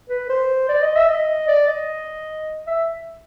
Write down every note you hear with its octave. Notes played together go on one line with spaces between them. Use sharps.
B4
C5
D5
D#5
E5
D#5
D5
D#5
E5